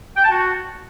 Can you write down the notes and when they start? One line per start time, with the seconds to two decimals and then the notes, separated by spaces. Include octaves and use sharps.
0.16 G5
0.24 A5
0.31 F#4